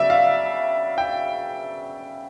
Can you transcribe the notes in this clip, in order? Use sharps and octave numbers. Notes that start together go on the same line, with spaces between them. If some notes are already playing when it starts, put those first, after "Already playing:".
Already playing: C#3 F#3 B3 D5 E5
F5
G5